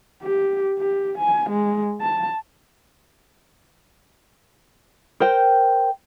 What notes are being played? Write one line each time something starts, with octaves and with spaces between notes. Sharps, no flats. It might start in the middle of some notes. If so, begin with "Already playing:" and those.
G4
G4
G#5
G#3
A5
A#4 C5 G5